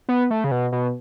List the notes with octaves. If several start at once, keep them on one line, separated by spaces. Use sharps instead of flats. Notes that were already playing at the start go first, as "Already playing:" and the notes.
B3
A3
C#3
B2
B2